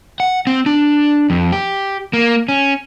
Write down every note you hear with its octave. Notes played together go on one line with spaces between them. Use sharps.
F#5
C4
D4
F2
G4
A#3
C#4